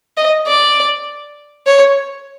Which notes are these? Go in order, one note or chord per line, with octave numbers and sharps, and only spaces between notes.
D#5
D5
C#5